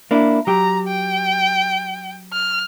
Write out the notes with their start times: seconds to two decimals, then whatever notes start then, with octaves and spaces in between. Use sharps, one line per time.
0.11 A#3 D4 E4
0.47 F#3 G4 A#5
0.88 G5
2.33 F6